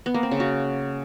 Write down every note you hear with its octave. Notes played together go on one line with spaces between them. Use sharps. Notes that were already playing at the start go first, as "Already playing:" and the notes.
B3
A#3
C4
C#3
F#4